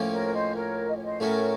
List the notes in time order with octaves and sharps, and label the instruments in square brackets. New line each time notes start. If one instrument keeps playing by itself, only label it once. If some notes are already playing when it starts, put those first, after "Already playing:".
Already playing: [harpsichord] A2 F3 A#3 C#4
[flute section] A#4 C#5
C5 D#5
A#4 C#5
D#5
C#5
C5 D#5
[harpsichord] A2 A3 C#4 F#4 [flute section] A#4 C#5